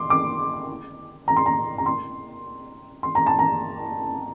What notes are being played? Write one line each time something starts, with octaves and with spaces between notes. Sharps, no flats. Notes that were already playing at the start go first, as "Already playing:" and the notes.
Already playing: C6 D6
D6
A#5
C6
A#5
A#5
C6
C6
A#5
A5
A#5